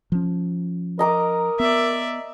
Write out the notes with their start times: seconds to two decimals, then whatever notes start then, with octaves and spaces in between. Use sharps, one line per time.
0.12 F3 C#4
0.99 A#4 D#5 A#5 D6
1.60 B3 D5 E5